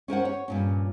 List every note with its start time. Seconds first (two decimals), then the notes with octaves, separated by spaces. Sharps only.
0.08 C#4 A#4 C5 F#5
0.25 C#5
0.48 G2 A#2 C#4